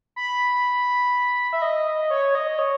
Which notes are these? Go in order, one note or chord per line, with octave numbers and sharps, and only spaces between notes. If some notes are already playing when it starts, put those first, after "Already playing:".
B5
E5
D#5
C#5
D#5
C#5